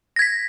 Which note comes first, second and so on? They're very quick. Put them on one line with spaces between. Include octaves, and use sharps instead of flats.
A#6 G#6 B6